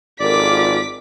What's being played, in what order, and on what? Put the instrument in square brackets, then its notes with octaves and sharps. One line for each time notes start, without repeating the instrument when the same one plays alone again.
[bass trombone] G#1 [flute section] F4 A4 A#4 [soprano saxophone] D5 [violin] D6 B6